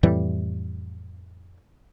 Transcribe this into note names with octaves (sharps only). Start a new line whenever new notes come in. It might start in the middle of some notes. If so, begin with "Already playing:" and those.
F2 A2 E3 G3